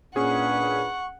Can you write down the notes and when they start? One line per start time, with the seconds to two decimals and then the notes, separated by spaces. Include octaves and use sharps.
0.16 A#2 C#4 D4 G#4 B4 F#5 C#6